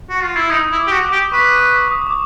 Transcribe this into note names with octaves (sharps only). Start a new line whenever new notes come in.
F#4
F4
E4
D#4 D#6
E4
D6
G4
F#4
D6
G4
B4 C#6
D6
D#6
D6